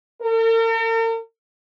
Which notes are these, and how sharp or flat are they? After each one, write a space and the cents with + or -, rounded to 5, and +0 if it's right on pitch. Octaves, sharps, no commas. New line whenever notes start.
A#4 -45